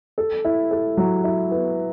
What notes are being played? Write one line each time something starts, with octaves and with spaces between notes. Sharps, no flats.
A4
E4
A4
F#3
E4
B3